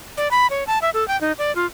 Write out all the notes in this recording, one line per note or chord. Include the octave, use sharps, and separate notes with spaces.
D5
B5
C#5
A5
E5
A4
G5
D#4
D5
F4